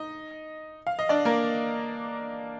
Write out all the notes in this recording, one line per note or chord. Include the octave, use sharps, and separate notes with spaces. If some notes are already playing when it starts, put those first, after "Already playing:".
Already playing: D#4 D#5
F5
D#5
D4 D5
A#3 A#4